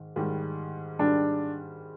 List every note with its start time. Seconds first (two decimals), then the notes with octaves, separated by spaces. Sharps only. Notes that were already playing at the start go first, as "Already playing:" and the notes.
Already playing: G#2 D#3
0.16 G#2 D#3 G3
0.99 G#2 D#3 G3 D4